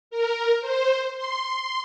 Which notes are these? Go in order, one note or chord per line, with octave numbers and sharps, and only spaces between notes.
A#4
C5
C6